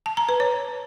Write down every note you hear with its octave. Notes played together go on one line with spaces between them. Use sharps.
A5
A#5
B4
C#5